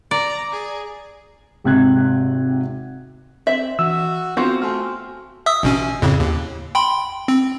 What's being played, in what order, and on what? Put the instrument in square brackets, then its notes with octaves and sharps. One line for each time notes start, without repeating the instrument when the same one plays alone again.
[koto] D5 [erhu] A#5
[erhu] G#4
[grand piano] G#1 C3 G5 F#6 G#6
[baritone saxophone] C4 [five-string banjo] E5 [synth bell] F#7
[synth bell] E3 [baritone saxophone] F#4 [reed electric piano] E6
[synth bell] B3 [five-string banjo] C4 F#4 C5 [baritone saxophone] F4
[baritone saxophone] A3 [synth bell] G#5 C6 F6
[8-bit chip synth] E5 D#6 E6
A1 B2 C#4
F2 A2 C#3
D#2
G5 B5 C6
C4